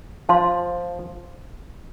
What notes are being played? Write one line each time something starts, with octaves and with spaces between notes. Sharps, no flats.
F3 C5 F5 A5 C6